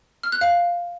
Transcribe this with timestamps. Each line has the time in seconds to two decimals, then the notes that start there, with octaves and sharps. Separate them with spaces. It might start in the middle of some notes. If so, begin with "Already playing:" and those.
0.23 F6
0.32 F#6
0.41 F5